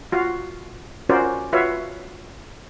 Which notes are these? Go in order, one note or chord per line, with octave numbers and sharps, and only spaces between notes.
F4 F#4 F5
C#4 F4 F#4 A#4 C5 D5
F4 F#4 B4 C#5 E5 F5